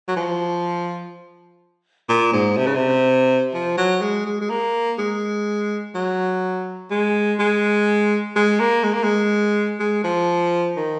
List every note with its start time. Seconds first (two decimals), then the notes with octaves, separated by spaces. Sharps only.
0.08 F#3
0.16 F3
2.09 A#2
2.33 G#2
2.57 C3
2.66 C#3
2.75 C3
3.54 F3
3.77 F#3
4.01 G#3
4.26 G#3
4.41 G#3
4.50 A#3
4.98 G#3
5.95 F#3
6.90 G#3
7.39 G#3
8.36 G#3
8.60 A#3
8.83 G#3
8.93 A#3
9.03 G#3
9.80 G#3
10.04 F3
10.76 D#3